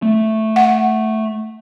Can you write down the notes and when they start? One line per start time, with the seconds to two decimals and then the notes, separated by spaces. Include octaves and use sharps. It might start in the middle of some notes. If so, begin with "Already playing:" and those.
0.02 A3
0.56 F#5